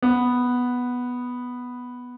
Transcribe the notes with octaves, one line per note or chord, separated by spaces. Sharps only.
B3